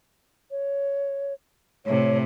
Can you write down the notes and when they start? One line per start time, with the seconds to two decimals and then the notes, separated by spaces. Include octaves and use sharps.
0.51 C#5
1.86 A2 C3 C#5